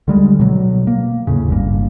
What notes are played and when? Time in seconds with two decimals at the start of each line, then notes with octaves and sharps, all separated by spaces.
0.08 D3 G3 G#3
0.40 B2 F#3
0.87 A#3
1.27 D#2 A2 C#3
1.49 G1 G2 A#3